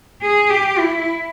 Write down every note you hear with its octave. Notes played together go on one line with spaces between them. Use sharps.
G#4
G4
E4